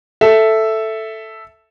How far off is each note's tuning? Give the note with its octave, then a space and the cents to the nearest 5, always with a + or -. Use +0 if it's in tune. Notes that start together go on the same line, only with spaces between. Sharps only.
A4 +0 E5 +0